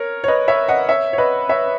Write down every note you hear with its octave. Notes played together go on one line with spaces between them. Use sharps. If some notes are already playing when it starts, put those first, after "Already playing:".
Already playing: A#4 C#5
C#5
B4 D#5
C#5 E5
D#5 F#5
C#5 E5
C#5
B4 D#5
C#5 E5